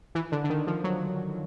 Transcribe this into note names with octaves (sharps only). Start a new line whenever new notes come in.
E3
D3
D3
D#3
F3
F#3